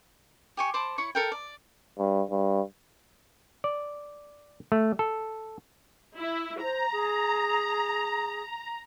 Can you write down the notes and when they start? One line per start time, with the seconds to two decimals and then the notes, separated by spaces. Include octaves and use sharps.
0.57 G4 G#5 C#6
0.74 C5 A5 B5 D6
0.98 E4 C#5 C#6
1.15 A4 A#4 G5
1.32 D5
1.98 G2
2.30 G2
3.64 D5
4.72 A3
4.99 A4
6.18 E4
6.62 C5 A#5
6.92 G#4